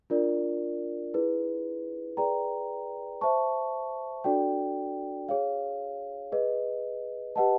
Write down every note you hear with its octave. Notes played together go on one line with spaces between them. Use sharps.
D4 F4 A#4 D5
E4 G#4 B4
G#4 B4 D5 G5 A#5
C5 E5 A5 C#6
D4 F#4 A4 D5 G5
G#4 C#5 F5
G#4 B4 D#5
G4 B4 D#5 F#5 A5